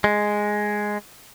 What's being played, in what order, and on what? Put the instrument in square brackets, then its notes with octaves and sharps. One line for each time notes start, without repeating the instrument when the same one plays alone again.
[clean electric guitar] G#3